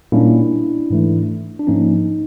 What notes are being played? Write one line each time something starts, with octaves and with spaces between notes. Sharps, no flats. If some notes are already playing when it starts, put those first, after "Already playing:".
A#2 G3 A#3 C#4 D4 E4
G#2 E3 A3
D4
G#2 F3 A#3 C#4 D#4